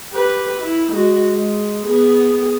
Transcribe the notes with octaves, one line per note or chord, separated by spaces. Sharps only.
G4 B4
E4
G#3 F#4
G#3
B3 G#4